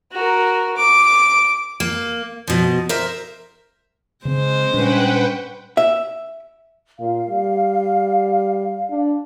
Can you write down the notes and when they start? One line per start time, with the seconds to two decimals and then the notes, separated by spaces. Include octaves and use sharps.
0.12 F#4 A#4
0.77 D6
1.80 A#3
2.47 B2 F3
2.89 A#4 C5 E5
4.25 C#3 G#3 C4 C5
4.73 A#2 G3 C#4 D4 B4 F#5 G5
5.77 E5
7.00 A#2 F5
7.30 G3
8.91 D4